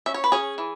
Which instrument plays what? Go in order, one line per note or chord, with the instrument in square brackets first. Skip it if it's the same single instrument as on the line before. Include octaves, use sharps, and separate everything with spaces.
[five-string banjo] C#4 E5
C#5
B4
C#4 G#4 C#5
E3